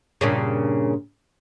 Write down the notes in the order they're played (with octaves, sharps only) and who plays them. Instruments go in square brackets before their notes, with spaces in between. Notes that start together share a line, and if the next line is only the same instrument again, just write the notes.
[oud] G2 A#2 C#3